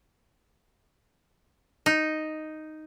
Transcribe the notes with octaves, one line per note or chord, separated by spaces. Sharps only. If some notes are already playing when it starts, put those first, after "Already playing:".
D#4